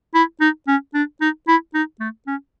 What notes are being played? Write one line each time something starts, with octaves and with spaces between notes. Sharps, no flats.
E4
D#4
C#4
D4
D#4
E4
D#4
A3
C#4